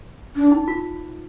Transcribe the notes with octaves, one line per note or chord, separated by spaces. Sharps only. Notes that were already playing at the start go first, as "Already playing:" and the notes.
D4
D#4
F4